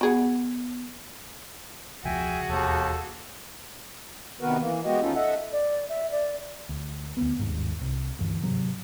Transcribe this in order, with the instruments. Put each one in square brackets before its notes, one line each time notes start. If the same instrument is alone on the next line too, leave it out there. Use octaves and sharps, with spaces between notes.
[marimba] B3 [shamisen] F#4 G#4 F#5
[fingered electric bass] E1 C#2 F3 [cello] F#4 G#4 [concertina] E5 G5 G#5
[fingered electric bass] E1 [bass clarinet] D#2 [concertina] A4 A5
[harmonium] C3 D#3 B3 F#4 A#4 B4
E3 A#3
G#3 B3 F#4 G4 D#5
D#2 C#4 D#4 F4 A4
A4 D#5 E5 F#5
[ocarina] D5
E5
D5
[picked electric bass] D2
D2 B3
G1 D#2 G#2
C2
D2 G2 E3
G#2 C3 F#3